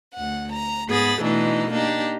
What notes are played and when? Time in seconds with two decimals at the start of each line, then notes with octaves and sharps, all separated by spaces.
0.14 D2 F#5
0.51 A#5
0.88 G#2 B3 G#4 B5 A6
1.21 B2 E3 A3 D4 D#4
1.71 A#3 D4 D#4 G4